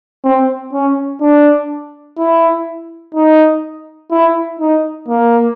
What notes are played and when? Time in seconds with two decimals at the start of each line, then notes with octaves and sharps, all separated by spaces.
0.24 C4
0.73 C#4
1.21 D4
2.18 E4
3.15 D#4
4.11 E4
4.60 D#4
5.08 A#3